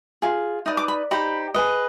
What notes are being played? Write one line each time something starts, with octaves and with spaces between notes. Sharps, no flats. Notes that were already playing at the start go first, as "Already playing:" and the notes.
F4 G#4
D#4 B4 D5 D#6
D6
B5
D#4 G4 C5 B5
G#4 B4 D#5